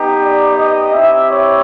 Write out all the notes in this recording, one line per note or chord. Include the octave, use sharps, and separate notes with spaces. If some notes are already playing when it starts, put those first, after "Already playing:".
Already playing: B3 D#4 G4
D5
D#5
C4 E4 G4 E5
C#5